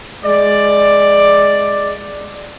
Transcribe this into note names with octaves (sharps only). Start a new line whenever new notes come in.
G#3 D5